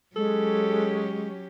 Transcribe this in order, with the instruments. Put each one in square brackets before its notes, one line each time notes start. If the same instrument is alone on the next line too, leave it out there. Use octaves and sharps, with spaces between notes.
[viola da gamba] F#3 C#4 G4 [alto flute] G#3 [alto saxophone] A4